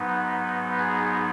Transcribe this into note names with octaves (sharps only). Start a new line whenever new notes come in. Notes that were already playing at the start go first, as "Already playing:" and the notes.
Already playing: G#2 F#3 B3 D#4 B4
G#4